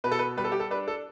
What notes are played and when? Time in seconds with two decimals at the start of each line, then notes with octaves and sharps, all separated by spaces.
0.04 B2 B4
0.12 A4
0.19 B4
0.37 G3 B4
0.44 A4
0.52 G4
0.60 A4
0.70 D4 B4
0.88 A4